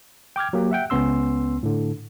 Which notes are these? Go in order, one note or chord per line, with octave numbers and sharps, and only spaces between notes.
G5 D6 F6 G#6
F#3 A#3 G4
E5 F#5 G5
C#2 B3 C#4 C6 E6
A2 D3